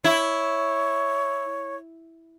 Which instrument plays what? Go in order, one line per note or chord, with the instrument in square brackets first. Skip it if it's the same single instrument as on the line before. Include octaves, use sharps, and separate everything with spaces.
[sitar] E4 [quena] C#5